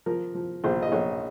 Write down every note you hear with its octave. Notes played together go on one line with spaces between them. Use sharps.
F3 A#4
F3
A#1 C5
D#5
A#1 C#5